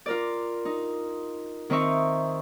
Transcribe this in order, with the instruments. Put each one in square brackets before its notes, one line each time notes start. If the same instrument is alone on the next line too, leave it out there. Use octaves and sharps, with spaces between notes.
[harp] F4 A#4 D5
D#4
D#3 C4 D#4 E5 C#6